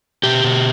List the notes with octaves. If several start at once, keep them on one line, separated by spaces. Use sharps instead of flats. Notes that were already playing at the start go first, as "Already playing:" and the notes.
B2 G4
B2